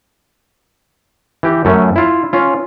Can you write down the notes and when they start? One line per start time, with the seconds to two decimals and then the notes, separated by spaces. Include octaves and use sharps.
1.43 E3 G4
1.65 F#2 A3 C#4
1.96 E4 F4
2.33 C#4 F4